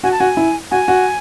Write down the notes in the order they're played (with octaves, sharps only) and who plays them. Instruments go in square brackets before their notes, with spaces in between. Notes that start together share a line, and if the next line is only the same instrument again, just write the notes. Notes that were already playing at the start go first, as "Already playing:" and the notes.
[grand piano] F#4 [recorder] G#5
[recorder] A5
[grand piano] F#4 [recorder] G#5
[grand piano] E4
[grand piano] F#4 [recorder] G#5
[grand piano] F#4